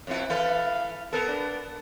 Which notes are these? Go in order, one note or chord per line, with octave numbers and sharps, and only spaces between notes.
F2 B2 E4
E3 A4 B4 F5
B3 A4 A#4
D4